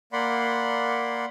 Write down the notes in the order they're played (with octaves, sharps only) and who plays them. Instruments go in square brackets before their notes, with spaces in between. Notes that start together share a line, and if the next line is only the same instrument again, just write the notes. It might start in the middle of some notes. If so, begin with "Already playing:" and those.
[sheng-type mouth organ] A#3 D5 F#5 B5 C6